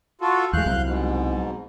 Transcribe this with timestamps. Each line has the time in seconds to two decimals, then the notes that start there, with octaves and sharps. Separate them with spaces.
0.21 F4 F#4 A4
0.53 E2 G#3 F5 F#6 G6
0.66 C2 C3 F#3
0.84 G#2 B2